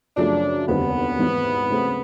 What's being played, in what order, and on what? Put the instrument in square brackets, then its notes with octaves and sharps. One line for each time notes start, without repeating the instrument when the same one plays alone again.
[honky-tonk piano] F#2 C#3 F3 A3 [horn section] D4
[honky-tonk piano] F1 D#2 D3 G3 C4 [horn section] B3
[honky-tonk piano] G#1 G#2 E3
C#3 F#3 A3 C4